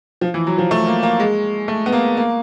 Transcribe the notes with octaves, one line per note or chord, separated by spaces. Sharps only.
F3
E3
F#3
F3
A3
A#3
A#3
G#3
A3
B3
A#3
A#3